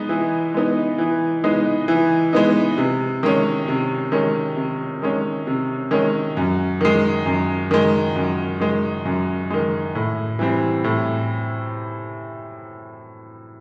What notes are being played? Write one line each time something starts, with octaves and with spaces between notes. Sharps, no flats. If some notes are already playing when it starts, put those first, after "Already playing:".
Already playing: G#3 B3 D#4
E3
G#3 B3 D#4
E3
G#3 B3 D#4
E3
G#3 B3 D#4
C3
D#3 G#3 C#4
C3
D#3 G#3 C#4
C3
D#3 G#3 C#4
C3
D#3 G#3 C#4
F#2
D#3 G#3
F#2
D#3 G#3
F#2
D#3 G#3
F#2
D#3 G#3
A2
E3 G3 C4
A2